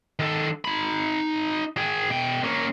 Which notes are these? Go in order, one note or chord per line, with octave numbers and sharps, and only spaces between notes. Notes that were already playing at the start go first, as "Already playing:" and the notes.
D#3 A4
D#4 B5
G#4 G5
B2 G5
A#3 C#4